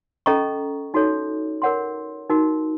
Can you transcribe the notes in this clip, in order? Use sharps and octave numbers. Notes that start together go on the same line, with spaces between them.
C#4 A4 D#5 A#5 C#6
D#4 F#4 A4 C#5
A#4 C#5 F#5 C6
D#4 F#4 A#4